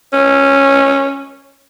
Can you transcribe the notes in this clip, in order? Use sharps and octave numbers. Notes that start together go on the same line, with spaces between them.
C#4